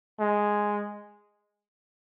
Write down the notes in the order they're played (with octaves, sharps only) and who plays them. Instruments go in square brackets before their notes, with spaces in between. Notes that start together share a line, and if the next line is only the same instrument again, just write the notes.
[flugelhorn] G#3